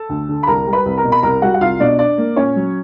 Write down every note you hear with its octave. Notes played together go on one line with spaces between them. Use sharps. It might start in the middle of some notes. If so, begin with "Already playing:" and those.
Already playing: A4 A5
D2
D3
B5
C2 A#4 A#5
G3
B4 B5
C2
A#4 A#5
B2
B5
C2 A#4 A#5
G3 F#4 F#5
F#5
C2 F4 F5
B2 D4 D5
D4 D5
A#3
A#2 C#4 C#5
F#3